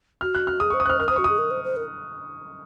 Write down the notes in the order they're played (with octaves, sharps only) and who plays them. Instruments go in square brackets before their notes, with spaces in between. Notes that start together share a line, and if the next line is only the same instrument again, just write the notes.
[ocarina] F#4 [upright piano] F6
[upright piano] F#6
F6
[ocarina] G#4 [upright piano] D#6
[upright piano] C#6
[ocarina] C5
[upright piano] D#6
[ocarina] C5 [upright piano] F6 F#6
[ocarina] A#4 [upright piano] F6
[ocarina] C5 [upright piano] D#6
[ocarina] F#4 [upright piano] C#6
[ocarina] G#4 [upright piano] D#6
[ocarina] A#4
C5
C5
A#4